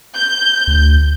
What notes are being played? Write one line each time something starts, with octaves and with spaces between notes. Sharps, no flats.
G6
D2